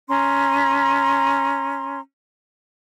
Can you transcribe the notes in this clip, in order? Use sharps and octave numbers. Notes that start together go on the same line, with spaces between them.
C#4 A#5 C6